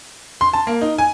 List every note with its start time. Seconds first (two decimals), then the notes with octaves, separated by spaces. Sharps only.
0.41 C6
0.53 A5
0.67 A#3
0.81 D#4
0.98 G#5